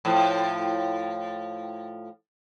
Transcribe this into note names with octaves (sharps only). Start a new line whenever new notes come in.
A2 F3